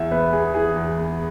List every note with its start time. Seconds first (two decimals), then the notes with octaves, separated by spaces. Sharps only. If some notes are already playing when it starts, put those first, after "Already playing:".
Already playing: E2 E3 E5
0.11 B3 B4
0.33 E2 G#4
0.54 E3 G#4
0.76 E2
0.97 B3